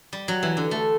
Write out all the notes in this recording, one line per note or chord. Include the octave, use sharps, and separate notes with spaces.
G3
F#3
E3
D3
A3